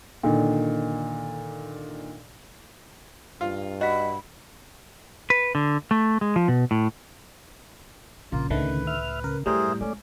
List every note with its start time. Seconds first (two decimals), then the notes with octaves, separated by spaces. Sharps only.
0.23 A#2 D3 D#3
3.41 G2 F4
3.81 F#4 D#5 B5 B6
5.30 B4
5.55 D3
5.91 A3
6.21 G#3
6.36 F3
6.48 B2
6.71 A2
8.32 A#1 C#3 A#3 F4
8.50 C#2 A2 D3 D#3 A3 B4
8.87 E5 F6
9.24 C#3 A#4
9.46 F#2 A2 G3 G#4 A#4 C5 E5
9.81 G#3 A3 C#4 D5